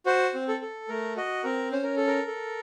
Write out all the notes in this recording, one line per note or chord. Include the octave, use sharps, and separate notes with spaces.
F#4 C5
C4
A4
A4
A3 A#4
F#4 D#5
C4 A#4
C#4 C5
A#4
A4
A#4
A4